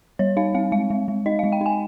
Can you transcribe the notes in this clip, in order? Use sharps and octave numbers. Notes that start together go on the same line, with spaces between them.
G3 C#5
D#4 F5
C4 F5
G#3 F5
G#3
G#3
D#4 D#5
G#3 F5
G5
D#4 G#5